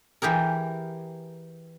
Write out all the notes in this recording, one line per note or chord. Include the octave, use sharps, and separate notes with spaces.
E3 G4 G#4 A#4